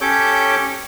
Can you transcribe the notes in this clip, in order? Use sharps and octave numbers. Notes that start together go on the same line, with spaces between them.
C#4 G4 A4 C#5 D6 G6